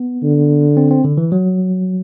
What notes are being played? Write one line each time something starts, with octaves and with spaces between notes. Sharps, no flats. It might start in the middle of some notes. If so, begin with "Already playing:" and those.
Already playing: B3
D3
C4
C4
D3
E3
F#3